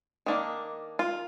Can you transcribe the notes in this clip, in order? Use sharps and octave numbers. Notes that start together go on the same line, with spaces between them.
D#3 A#3 D4
F4